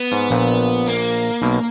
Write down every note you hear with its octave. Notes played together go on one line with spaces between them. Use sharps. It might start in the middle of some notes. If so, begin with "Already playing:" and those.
Already playing: B3
G#2
A#1 A#2
A#3
B1 B2